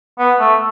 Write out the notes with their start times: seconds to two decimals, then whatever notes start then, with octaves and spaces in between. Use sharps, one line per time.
0.19 B3
0.39 A3